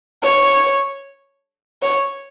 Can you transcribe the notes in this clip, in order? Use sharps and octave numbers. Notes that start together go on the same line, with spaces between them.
C#5
C#5